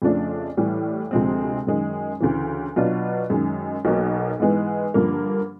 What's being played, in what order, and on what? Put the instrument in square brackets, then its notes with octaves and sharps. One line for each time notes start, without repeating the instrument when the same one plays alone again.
[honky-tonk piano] F2 C#3 F3 A3 D4
A2 E3 G3
D2 C3 F3 G#3 C4
F#2 D#3 G#3
D2 C#3 E3
B2 F#3 B3 D4 F4
F#2 D#3 G#3
B1 B2 F#3 A#3
G#2 E3 G#3 B3
G2 D3 F3 A#3